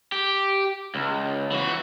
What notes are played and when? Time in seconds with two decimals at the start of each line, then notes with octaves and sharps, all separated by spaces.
0.12 G4
0.95 C#2
1.51 E3 F#4